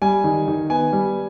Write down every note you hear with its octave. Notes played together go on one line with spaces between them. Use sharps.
G3 G#5
D#3
D#3
B3 G#5
G3